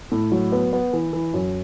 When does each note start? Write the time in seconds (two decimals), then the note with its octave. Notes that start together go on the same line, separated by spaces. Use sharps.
0.12 A2
0.32 F#3
0.52 B3
0.73 B3
0.93 E3
1.13 E3
1.34 F#2